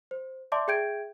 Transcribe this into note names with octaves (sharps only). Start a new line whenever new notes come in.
C5
D5 E5 A5 C6 D6
G#4 E5 G5 G6 G#6 D7